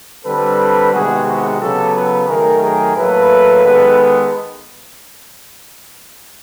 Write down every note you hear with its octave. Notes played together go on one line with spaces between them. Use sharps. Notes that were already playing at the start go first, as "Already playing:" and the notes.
D3 G3 C4 A4 B4
C3 D#3 G#3 B3 F#4 G#4
F#4 G#4
C#3 F#3 B3 G4 A4
A4 B4
D#3 F#3 A3 G#4 A#4
G#4 A#4
A2 F#3 A#3 A4 B4
D#3 G#3 B3